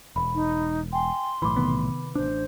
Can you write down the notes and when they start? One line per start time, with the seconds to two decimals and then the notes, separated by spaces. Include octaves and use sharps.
0.16 E1 B5
0.35 D#4
0.93 G5 G#5 C6
1.42 B1 A2 E3 B5 D6
1.56 C3 D#3 B3
2.15 A1 D4 C5